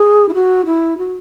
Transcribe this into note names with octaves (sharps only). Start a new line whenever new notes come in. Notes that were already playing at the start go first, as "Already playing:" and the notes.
Already playing: G#4
E4
F#4
E4
F#4